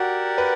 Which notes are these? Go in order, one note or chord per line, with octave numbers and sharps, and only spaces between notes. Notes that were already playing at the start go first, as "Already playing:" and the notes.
Already playing: F#4 G4 A#4 D5 F#5
B4